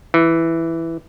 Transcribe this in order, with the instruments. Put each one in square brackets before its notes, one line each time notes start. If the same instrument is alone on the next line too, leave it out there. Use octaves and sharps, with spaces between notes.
[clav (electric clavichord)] E3